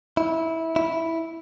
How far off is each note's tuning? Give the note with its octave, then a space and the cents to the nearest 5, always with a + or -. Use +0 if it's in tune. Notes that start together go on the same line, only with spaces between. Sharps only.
E4 -15
E4 -5